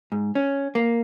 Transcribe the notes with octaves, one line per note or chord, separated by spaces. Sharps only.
G#2
C#4
A#3